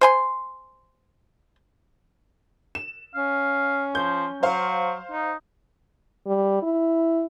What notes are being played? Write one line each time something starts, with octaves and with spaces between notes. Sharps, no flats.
C5 G#5 C6
E7
C#4 F5
F3 G6
F#3 C5 F5
D#4
G3
E4